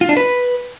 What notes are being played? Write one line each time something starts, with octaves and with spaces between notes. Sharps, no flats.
F4
D4
B4